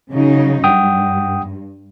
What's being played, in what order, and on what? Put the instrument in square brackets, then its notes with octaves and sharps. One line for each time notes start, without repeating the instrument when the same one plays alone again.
[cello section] C#3 F#3 D#4
[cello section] G2 [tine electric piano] F#5 G5 D#6